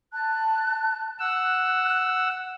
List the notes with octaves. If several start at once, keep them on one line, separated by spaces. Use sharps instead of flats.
A5 F#6
F#5 E6 F#6